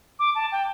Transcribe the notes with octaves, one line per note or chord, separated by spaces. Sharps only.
D6
A5
G5